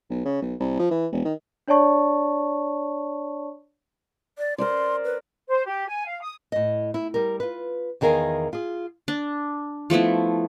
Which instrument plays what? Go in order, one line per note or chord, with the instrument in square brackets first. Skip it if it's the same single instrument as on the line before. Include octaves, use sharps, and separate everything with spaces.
[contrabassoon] B1
C#3
B1
C2
F3
E3
E1
D#3
[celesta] D4 C#5 D5 A5 C#6
[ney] D5
[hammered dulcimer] A#4 C5 D5 [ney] C6
[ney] B4
[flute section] C5
G4
G#5
F5
D#6
[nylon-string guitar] A2 D#5
E4
G3 A#4
F4 B4
E2 D#3 G#4 A#4 F5 G#5
F4 G#4
[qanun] D4
F3 A3 B3 E4